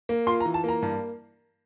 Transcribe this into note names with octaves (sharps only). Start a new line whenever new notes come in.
A#3
F4 C6
A#5
E3
A5
A#3 A#5
G2